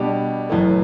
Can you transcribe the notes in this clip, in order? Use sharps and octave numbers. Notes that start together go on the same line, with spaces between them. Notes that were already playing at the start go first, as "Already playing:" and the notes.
Already playing: B2 G3 D4 G4
F#1 F#2 E3 A3